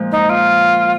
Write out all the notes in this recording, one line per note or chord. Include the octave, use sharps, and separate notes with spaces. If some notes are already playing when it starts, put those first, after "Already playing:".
Already playing: A#2 F3 G#3
D#4
F4